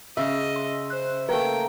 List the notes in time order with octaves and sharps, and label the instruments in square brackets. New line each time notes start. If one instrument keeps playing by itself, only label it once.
[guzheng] C#3 C#4 [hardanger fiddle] D#5 [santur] E5
[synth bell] C6
[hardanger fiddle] C5 [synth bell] F#6
[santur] A3 A#3 [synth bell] B4 [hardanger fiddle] G5